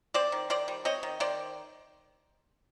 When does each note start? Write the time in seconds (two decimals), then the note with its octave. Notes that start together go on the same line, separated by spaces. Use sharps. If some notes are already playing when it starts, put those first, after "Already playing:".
0.14 C4 C5 D5
0.32 D#3
0.50 D#3 C5 D5
0.68 G3
0.85 C4 C#5 D#5
1.03 D#3
1.20 D#3 C5 D5